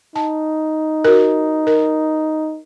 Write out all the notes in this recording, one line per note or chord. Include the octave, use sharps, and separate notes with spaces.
D#4 A5
F#4 A#4
A#4